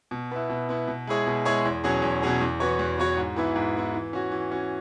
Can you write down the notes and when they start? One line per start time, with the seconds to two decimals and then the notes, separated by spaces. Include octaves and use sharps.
0.11 B2
0.31 B3 E4
0.49 B2
0.69 B3 E4
0.88 B2
1.07 G#3 E4 G#4 C#5
1.27 B2
1.45 G#3 E4 G#4 C#5
1.65 E2
1.84 B2 F#3 C#4 G#4
2.02 E2
2.22 B2 F#3 C#4 G#4
2.41 E2
2.60 E3 B3 F#4 C#5
2.79 E2
2.98 E3 B3 F#4 C#5
3.17 G#2
3.36 E3 B3 E4
3.56 G#2
3.75 E3 B3 E4
3.94 E3
4.13 C#4 F#4
4.32 E3
4.51 C#4 F#4